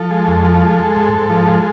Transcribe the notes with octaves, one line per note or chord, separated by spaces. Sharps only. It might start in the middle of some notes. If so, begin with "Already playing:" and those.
Already playing: F3 A4
G#3
F2
F3
G#3
G#3
G#2
G#2
F3
G#3